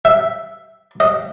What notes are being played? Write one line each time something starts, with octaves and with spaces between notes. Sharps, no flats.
E5
D#5